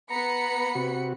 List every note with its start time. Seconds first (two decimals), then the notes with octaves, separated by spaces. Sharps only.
0.10 B3 A#5 B5 C#7
0.75 C3 F#4